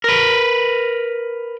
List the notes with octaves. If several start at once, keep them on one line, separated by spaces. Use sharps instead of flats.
A#4 B4